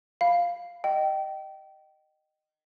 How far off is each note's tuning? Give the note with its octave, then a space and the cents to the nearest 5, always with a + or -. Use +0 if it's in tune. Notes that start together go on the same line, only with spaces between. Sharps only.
F5 +0 B5 +0
D#5 -15 G5 -25